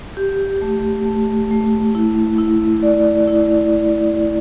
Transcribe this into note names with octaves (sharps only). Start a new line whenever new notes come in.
G4
A3
A3
A3
E4
E4
D5
E4